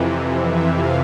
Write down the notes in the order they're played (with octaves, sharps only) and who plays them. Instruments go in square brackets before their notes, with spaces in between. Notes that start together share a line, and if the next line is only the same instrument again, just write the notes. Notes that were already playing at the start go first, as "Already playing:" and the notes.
Already playing: [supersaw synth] F2 C3 E3
E5
F5